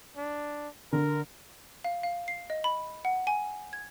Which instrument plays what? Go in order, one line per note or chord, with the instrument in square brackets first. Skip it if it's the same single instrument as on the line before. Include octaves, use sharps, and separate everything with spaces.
[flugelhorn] D4
[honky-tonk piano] D3 [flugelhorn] A#4
[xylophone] F5
F5
C7
D#5
B5
F#5
G#5
G#6